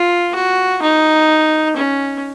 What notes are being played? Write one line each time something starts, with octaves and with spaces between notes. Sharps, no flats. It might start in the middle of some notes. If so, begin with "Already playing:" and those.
Already playing: F4
F#4
D#4
C#4